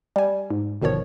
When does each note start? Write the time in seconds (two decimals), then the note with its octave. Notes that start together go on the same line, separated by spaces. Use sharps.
0.16 G3 G#5
0.50 G#2
0.82 G1 B2 D#3 F3 C#5